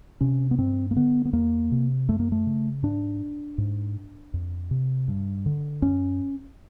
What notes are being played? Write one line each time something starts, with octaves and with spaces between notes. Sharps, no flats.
C3 C#4
B3
G2 C4
A#3
D3 B3
B3
E2 A#3
C3
F#2 A3
A#3
A3
C#3
G#2 D4
G#2
F2
C3
G2
D3
F#2 C#4